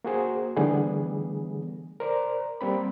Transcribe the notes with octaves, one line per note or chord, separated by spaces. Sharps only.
A#3 F#4 G#4 C5
D3 E3 G3 A3 B3 G#4
A#4 C5 D5 A#5
G3 A#3 C4 B5